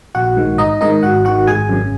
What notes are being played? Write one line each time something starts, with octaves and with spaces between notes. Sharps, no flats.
A#1 F#4 F#5
G#2 D#3
G#1 D#4 D#5
G#2 D#3 D#4 D#5
G#1 F#4 F#5
G#2 D#3 F#4 F#5
G#1 G#4 G#5
F#2 C#3